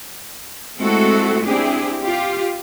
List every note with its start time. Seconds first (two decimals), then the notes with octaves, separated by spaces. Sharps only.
0.78 G#3 A3 C4 E4 F#4 A4
1.45 C4 D4 E4 G4 G#4
2.03 F4 G4